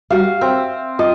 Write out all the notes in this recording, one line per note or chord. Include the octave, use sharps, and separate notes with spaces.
G3 F#4 F5
C4 E5
F4 D#5